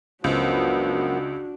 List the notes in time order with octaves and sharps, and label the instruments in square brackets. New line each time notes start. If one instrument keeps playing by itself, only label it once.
[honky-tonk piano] C#2 [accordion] F#2 F3 B3 [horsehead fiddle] D4 F#4